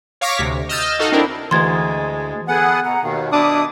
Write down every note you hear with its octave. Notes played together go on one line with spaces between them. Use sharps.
C#5 F5 C#6 D6 A#6 B6
D2 C3
D#5 E6 F6 G6 A6
D#4 F#4 A4 D#5 F5
C4 D4 E4 A#4
D2 E3 G#3 C6 G#6 A6
B3 G#4 A4 F#5 G#5
B2 F#5 A#5
D#2 B2 D#3 F5
B2 D4 E4 D6 D#6